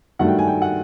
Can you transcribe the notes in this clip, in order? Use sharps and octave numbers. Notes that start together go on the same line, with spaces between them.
G2 D#3 F#3 A3 F#5
G5
G#5
G5
F#5